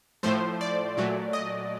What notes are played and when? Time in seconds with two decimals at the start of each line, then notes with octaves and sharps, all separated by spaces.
0.23 A2 F3 A3 C5
0.61 D5
0.97 A#2 F#3 A3
1.33 D#5